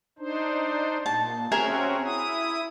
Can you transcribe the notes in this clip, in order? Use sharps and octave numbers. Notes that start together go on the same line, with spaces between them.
D4 D#4 C5
A#2 A5
C4 C#4 F#4 G#4 A#4 E5
E4 D#6